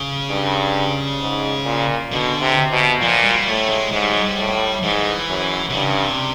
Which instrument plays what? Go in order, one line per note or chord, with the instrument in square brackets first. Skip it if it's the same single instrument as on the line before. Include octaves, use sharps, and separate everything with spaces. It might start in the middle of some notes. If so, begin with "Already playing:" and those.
Already playing: [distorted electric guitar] C#3
[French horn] G2
G#2
A#2
[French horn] B2 [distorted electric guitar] D3
[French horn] C3
B2
[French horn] A#2 [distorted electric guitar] F3
[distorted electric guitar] G3
[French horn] A2 [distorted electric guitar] A3
[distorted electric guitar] G#3
[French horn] G#2 [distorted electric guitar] G#3
[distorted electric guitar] G3
F#3
G3
[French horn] A2
[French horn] G#2 [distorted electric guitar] E3
[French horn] F#2
[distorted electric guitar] C3
[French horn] G2 [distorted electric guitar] C#3
[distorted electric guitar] C3